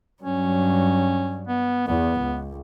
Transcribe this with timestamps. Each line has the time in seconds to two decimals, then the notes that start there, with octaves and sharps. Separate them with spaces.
0.22 G2 F#3 C#4
1.48 B3
1.87 E2 B3
2.19 C#2